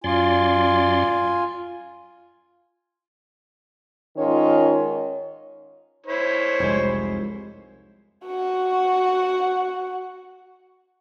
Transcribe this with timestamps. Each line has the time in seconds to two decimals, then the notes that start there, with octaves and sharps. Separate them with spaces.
0.04 F#2 F4 D5 G#5 C6
4.17 G#2 D#3 C#4 F4 A#4 C#5
6.06 E4 C5 C#5
6.60 F1 C2 G#3
8.26 F#4 F#5